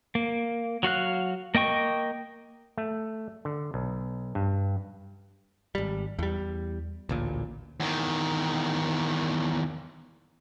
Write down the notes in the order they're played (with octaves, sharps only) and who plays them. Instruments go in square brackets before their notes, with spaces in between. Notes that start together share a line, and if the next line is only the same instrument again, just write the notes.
[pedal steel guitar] A#3
F#3 F#4 F5 F#6
A#3 D#5 G5 C#6
[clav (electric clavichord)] A3
D3
B1
G2
[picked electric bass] G#1 G3
E2 G3
A1 D2 A#2
[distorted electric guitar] E2 D#3